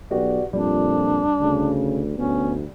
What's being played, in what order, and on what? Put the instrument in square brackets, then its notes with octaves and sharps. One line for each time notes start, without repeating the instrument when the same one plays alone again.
[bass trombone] B1 [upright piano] F#4 G4 B4 [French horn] D5
[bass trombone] F2 [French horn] A#2 [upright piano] G3 [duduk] D4
[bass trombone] D2 [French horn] C#3
[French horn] D2 [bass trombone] B3 [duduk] C#4